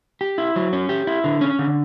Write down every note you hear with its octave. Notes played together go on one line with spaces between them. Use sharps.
G4
E4
F#3
C#4
G4
E4
D3
C#4
D3